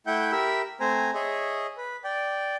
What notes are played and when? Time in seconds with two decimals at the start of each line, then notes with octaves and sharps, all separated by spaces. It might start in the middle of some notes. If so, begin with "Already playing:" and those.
0.07 A3 E4 E5 F#5 G5 G6
0.32 G4 A#4 E5 B5 E6
0.80 A3 C4 C5 G#5 A#5
1.14 G#4 C#5 D#5 E5
1.77 B4
2.04 D5 G5